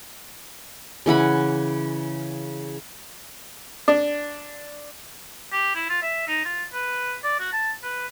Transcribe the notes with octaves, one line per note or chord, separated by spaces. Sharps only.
C#3 E3 F#5 B5
D4
G4
E4
F4
E5
D#4
F4
B4
D5
F#4
A5
B4